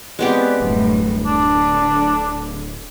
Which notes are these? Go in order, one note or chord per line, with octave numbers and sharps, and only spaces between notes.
G#3 B3 C4 G4 D5
D1 F#2 A2 G3
D3 D4